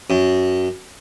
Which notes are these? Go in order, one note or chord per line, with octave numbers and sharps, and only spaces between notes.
F#2